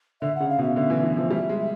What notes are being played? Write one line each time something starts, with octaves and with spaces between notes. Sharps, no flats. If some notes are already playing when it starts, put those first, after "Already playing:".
D3 E5
C#3 F#5
F5
B2
E5
D3 E5
E3
E3
F3
G3 E5
G#3